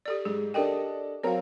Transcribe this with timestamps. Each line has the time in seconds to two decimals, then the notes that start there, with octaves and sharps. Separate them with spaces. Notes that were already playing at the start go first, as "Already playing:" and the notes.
0.06 G4 A4 D5
0.25 G#2 G#4
0.54 D4 G4 A4 A#4 D#5 G5
1.23 F#3 C4 A#4 C#5 F5